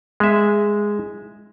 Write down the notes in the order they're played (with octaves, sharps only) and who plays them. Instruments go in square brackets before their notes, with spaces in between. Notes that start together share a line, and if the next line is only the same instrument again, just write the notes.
[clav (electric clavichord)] G#3 E5